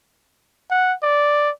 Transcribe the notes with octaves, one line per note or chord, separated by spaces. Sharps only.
F#5
D5